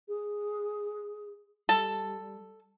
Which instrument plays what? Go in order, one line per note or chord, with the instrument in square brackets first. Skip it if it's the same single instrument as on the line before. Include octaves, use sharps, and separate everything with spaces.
[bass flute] G#4
[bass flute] G3 [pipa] A4